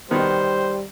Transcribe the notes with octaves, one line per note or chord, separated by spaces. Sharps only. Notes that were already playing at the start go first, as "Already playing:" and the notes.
B2 D#3 G3 B3 C5